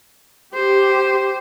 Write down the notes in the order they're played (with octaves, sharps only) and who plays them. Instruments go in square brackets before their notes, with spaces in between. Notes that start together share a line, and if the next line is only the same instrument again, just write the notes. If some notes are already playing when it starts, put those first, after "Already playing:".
[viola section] G4 [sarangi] C5